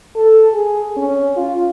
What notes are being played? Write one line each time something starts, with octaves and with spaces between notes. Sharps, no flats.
A4
G#4
C#4
F4